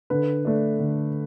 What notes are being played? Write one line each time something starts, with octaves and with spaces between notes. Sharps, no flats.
D3 B4
A3 D4
D3